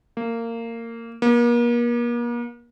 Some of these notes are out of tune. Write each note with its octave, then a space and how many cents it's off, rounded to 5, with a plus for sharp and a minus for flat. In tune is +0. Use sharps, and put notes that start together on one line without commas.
A#3 -20
A#3 +40